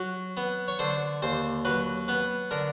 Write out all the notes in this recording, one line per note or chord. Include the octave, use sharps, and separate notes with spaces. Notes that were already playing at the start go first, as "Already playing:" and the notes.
Already playing: F#3
B3
C#5
D3 C5
D#2 C5
F#3 B4
B3 B4
D3 A#4